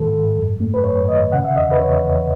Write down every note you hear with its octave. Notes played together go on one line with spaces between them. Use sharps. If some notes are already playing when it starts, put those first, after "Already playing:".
Already playing: G#2 D#3 G#3 A4
G#2
F#2
A3
B4
F#2 C#5
D#3 D#5
C#3 F#5
E5
E2 D#5
B4
E2 C#5
E2